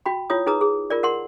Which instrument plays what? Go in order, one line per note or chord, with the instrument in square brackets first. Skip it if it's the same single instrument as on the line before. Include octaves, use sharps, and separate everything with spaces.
[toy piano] F#4 G5 B5
E4 F4 C#5 D#6
D#4 G#4 B4 A#5 D#6
G#4
F4 A#4 D5
A#4 F#5 C6